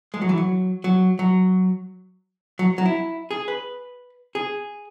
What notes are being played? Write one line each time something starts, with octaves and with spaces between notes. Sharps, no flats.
G#3
F#3
E3
F#3
F#3
F#3
F#3
F#3
E4
G#4
B4
G#4